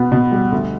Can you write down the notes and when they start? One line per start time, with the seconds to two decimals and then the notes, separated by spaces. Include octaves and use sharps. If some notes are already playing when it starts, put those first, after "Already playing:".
Already playing: B2 B3
0.12 B2
0.32 G3
0.52 D2